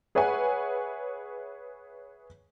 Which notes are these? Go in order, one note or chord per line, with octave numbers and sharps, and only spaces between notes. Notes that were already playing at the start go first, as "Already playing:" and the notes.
G#4 B4 C#5 E5 F#5 G#5